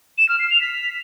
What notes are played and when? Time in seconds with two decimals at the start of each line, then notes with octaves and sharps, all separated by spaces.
0.18 E7
0.29 F6
0.39 C7
0.50 F7
0.61 B6